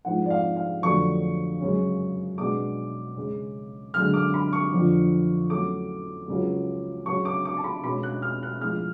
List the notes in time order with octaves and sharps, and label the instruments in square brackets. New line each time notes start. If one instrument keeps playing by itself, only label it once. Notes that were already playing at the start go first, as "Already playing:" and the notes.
[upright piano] G#2 F3 G#3 F#5
D5
F5
F5
F2 D3 F#3 A3 D4 C#6
F#2 C#3 G#3 C#4
B2 G#3 B3 D4 D6
C#3 G#3 C#4
F#2 D3 G#3 F6
D6
B5
C#6
F2 D3 F3
A2 F#3 A3 C#4 D6
C#2 C#3 F#3 C#4
C#3 F#3 C#4 C#6
D6
D6
A5
B5
B2 G#3 C#4 B5
F#6
F6
F#6
A2 F3 G#3 F6